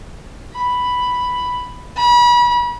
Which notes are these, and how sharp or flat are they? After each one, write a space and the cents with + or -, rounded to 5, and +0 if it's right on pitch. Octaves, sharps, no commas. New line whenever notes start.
B5 +5
B5 -35